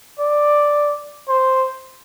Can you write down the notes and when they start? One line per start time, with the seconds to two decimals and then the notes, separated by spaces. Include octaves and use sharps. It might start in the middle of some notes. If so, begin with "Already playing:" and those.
0.19 D5
1.29 C5